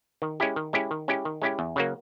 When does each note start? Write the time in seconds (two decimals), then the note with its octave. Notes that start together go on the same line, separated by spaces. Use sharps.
0.22 D#3
0.40 G#3 C#4 E4 G4
0.56 D#3
0.73 G#3 C#4 E4 G4
0.91 D#3
1.08 G#3 C#4 E4 G4
1.25 D#3
1.42 G#3 C#4 E4 G4
1.59 E2
1.76 C#3 F#3 A#3